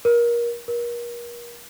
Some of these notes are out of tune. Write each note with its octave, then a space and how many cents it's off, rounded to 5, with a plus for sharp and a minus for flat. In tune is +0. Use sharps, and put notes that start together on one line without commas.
A#4 +25
A#4 +35